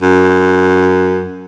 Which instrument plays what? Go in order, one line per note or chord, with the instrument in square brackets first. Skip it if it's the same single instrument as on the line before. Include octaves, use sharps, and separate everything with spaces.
[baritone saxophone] F#2